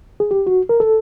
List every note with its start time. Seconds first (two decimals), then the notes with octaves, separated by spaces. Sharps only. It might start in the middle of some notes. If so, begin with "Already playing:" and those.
0.20 G#4
0.31 G4
0.47 F#4
0.69 A#4
0.80 A4